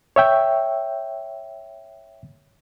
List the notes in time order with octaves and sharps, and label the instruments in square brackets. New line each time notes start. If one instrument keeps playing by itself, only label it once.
[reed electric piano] C#5 E5 G5